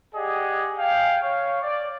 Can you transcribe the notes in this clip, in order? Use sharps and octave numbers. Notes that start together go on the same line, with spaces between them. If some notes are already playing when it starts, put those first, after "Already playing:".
G4 G#4 D5 D#5 F#5 G#5
F5 G5 G#5
C#5 F5
D5